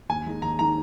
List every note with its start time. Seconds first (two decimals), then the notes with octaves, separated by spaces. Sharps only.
0.09 D#2 G#5
0.26 D#3 G#3 D#4
0.42 D#2 A#5
0.59 D#3 G#3 D#4 A#5